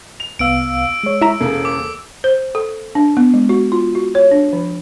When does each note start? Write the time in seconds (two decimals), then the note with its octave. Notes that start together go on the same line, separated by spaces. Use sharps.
0.20 F7
0.39 C2 B3 F5 E6 D7
1.03 G#3 C#5
1.21 E4 E5 A#5
1.40 E1 C#3 A#3 A4
1.65 D6
2.24 C5
2.55 A4
2.95 D4
3.17 B3
3.34 G#3
3.49 F#4
3.72 F4
3.95 F#4
4.15 C#5
4.31 D4
4.53 F3